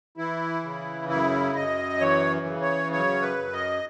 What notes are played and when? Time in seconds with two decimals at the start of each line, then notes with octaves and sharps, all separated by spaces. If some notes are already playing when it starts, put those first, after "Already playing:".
0.17 E3 E4
0.63 C#3
1.09 F#2 E4
1.55 F#2 D#5
2.00 E3 C#5
2.46 C#3
2.62 C#5
2.91 F#2 C#5
3.22 B4
3.38 F#2
3.53 D#5